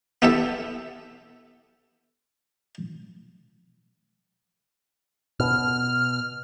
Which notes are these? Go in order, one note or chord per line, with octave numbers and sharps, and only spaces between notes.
B3 E4 G4 A4 E5
B2 F6